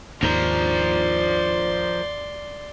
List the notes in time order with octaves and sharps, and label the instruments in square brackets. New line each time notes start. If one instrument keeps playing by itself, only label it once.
[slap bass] D#2 G#2 D#3 [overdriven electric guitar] F3 A#4 [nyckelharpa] D5 C6